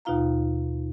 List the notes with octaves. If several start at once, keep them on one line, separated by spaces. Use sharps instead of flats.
D#2 B2 D#4 F4 F5 A#5